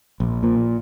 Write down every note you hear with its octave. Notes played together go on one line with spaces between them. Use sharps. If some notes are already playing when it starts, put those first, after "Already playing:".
A#1
A#2